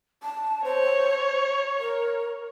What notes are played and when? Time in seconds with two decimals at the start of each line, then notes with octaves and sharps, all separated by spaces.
0.23 A5
0.65 C5 C#5
1.80 A#4